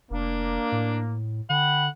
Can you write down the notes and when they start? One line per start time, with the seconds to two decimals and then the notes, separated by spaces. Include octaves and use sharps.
0.10 F1 A#3 D4
0.72 A2
1.50 D3 F#5 G5 B5